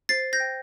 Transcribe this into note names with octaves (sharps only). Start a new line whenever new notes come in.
C5 A6 C7
G6 A#6
G5